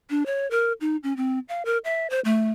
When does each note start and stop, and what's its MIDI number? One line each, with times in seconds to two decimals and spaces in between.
0.10 0.26 62
0.26 0.49 73
0.51 0.73 70
0.81 0.97 63
1.03 1.16 61
1.17 1.39 60
1.49 1.63 77
1.65 1.78 70
1.85 2.07 76
2.10 2.20 72
2.25 2.52 57